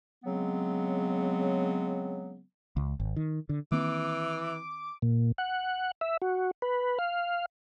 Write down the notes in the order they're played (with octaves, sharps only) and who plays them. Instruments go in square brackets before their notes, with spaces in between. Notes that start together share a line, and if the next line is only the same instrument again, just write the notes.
[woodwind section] C#3 F#3 G#3 B3 C4
[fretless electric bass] C#2
G#1
D#3
D3
[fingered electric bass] D#3 A#3 C4 [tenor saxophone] E3 [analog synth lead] D6
[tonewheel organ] A#2
F#5
E5
F#4
B4
F5